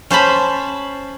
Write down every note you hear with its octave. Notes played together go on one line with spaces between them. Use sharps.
C#4 C5 A5 B5